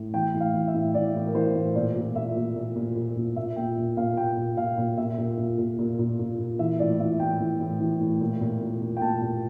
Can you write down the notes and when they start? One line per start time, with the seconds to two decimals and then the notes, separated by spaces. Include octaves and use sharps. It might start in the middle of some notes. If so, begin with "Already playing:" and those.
Already playing: A2
0.14 E3 G5
0.34 A2
0.40 F5
0.54 E3
0.68 E5
0.74 A2
0.94 E3 D5
1.14 A2
1.26 A#4
1.34 E3 C5
1.55 A2
1.75 A#2 D5
1.95 A#2
2.16 A#2 E5
2.36 A#2
2.56 A#2
2.76 A#2
2.96 A#2
3.16 A#2
3.36 A#2 E5
3.56 A#2 G5
3.77 A#2
3.97 A#2 F5
4.17 A#2 G5
4.37 A#2
4.57 A#2 F5
4.78 A#2
4.97 A#2 E5
5.18 A#2
5.38 A#2
5.58 A#2
5.78 A#2
5.99 A#2
6.19 A#2
6.39 A#2
6.59 E3 E5
6.79 A2 D5
6.99 E3 E5
7.20 A2 G5
7.40 E3
7.60 A2
7.80 E3
8.00 A2
8.20 A#2
8.41 A#2
8.61 A#2
8.81 A#2
8.97 G5
9.01 A#2 A5
9.22 A#2